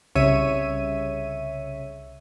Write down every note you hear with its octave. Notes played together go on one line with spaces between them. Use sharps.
C2 C#3 C#5 E5 D#7